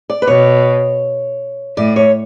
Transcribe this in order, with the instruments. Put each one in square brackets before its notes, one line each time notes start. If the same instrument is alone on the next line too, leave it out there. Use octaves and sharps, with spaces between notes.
[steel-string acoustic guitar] D5
B4
[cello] B2 [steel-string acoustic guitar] C#5
[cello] A2 [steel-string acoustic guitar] D5
[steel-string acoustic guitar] C#5